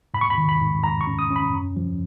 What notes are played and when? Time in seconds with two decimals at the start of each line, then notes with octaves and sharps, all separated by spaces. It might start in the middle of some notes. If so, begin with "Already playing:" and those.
0.14 G#2 B5
0.21 C#6
0.30 B5
0.37 D#3
0.49 B5
0.61 G#2
0.84 G#2 A#5
1.01 C#6
1.07 C#4
1.19 D#6
1.31 C#4
1.36 B5
1.53 F#2
1.77 F3